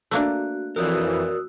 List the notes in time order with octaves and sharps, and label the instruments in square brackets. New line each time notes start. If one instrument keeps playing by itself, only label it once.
[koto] A3 A#3 D4 [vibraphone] F#4
[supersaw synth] F2 E3 [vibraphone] F#4 D#6 E6 [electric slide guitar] A#4 C#5 D5